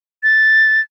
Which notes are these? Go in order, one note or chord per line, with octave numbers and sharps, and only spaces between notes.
A6